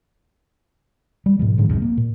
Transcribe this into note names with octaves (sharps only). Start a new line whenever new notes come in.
G3
G#2 B2 F3
G#2 D3 E3 G#3
D#1 B1 F2 G#2
A#3
A#2